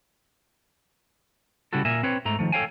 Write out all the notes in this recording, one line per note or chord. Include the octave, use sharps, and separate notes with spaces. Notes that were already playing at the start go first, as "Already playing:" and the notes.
C#3 G3 E4 F#4 A4
A#2 A#4 E5 G#5
C4 B4 C#5
G#2 A3 A#5
D#3 F3 A3
A4 B4 C#5 F5 G5 G#5